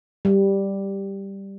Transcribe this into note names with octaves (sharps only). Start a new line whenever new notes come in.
G3